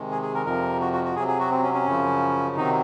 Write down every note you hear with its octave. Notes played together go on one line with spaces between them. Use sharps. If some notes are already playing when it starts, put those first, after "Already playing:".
Already playing: C3 D#3 G#3
G#4
G#4
A#4
F2 C3 F3 A#4
F#4
F#4
F#4
C3 F#3 G#4
G#4
F#4
C4
C#4
C#4
F#2 C#3 F3
C3 D#3 F#3 D#4